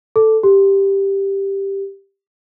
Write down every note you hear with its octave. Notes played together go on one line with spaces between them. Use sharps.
A4
G4